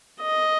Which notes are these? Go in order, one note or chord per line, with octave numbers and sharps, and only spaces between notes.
D#5